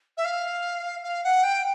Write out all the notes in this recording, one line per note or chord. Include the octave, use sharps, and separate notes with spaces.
E5
F5
F5
F#5
G5